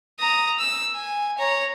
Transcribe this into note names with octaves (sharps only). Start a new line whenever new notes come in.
A#5 D#6
E6
G#5
C#5 A#5